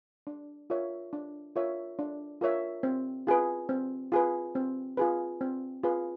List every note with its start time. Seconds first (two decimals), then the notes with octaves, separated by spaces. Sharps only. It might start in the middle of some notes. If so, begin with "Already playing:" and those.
0.27 D4
0.70 F4 A#4 C#5 E5
1.13 D4
1.56 F4 A#4 C#5 E5
1.99 D4
2.41 F4 A#4 C#5 E5
2.83 C4
3.27 F4 G#4 B4
3.69 C4
4.12 F4 G#4 B4
4.55 C4
4.97 F4 G#4 B4
5.41 C4
5.83 F4 G#4 B4